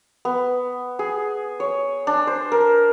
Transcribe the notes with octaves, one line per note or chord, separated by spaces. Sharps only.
B3
G#4
C#5
D4
C5
A#4